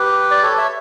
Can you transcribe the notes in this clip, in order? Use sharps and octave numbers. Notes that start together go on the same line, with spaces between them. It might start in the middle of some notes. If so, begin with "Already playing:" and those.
Already playing: G4 B4
D5
A4 C#5
C#5 E5